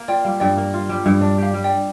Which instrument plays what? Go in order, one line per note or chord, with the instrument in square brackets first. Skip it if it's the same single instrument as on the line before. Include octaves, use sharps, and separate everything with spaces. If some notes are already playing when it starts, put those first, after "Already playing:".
Already playing: [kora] A#3
[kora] F4 [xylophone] D5 G5
[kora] G3 [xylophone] F5
[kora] G2 [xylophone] D5 G5
[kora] A#3
F4
G3
G2
[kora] D4 [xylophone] D5
[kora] G4 [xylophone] F5
[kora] G3
[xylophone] D5 G5